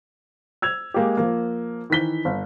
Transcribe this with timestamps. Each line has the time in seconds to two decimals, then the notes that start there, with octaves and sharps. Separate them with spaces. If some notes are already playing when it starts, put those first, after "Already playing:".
0.62 E6 G#6 F7
0.94 G#3 A#3 G4
1.17 F3 A#3
1.90 D#3 E3 B6 G7
2.25 G1